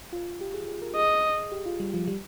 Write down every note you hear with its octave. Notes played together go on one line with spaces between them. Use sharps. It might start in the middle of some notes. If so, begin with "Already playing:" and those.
F4
G4
G#4
G#4
A#4
G#4 D#5
G4
F4
G3
F3
G3